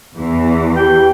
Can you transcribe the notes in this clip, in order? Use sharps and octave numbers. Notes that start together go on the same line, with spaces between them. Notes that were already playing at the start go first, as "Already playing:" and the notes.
E2 E3
G4 G5